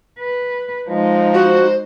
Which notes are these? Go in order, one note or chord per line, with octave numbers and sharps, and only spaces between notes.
B4
F3 G#3 D#4
F#4 C5